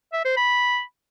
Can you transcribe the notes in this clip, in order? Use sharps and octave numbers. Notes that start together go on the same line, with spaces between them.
E5
C5
B5